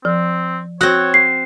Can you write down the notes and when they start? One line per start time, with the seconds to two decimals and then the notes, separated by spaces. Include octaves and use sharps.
0.05 F3 C4
0.81 C4 F#4 C#5 F#5 F#6 A#6
1.14 C7